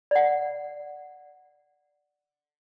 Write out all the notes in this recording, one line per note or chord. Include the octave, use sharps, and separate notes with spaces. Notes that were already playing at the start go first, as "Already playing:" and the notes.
D5 F#5